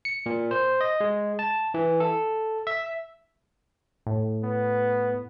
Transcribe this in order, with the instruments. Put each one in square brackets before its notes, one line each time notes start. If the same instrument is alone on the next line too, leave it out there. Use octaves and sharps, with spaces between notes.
[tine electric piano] C#7
A#2
C5
D#5
G#3
A5
E3
A4
E5
[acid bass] A2
[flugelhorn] B3